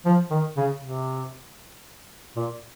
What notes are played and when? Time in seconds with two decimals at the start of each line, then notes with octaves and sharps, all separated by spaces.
0.06 F3
0.31 D#3
0.57 C#3
0.82 C3
2.36 A#2